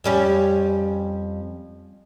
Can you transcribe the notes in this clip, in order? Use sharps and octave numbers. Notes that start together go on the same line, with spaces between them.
F2 G3 C#4